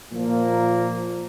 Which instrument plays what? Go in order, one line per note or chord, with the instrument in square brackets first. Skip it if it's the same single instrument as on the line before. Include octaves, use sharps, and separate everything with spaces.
[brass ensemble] A#2 F3 A#3